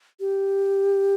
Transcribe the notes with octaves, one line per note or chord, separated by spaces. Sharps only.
G4